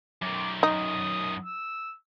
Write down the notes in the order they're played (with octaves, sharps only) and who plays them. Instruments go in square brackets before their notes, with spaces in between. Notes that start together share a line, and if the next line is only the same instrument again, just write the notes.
[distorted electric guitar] F#2 D#3 [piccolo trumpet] D6
[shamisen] D#4 [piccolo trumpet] D#6
[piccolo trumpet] E6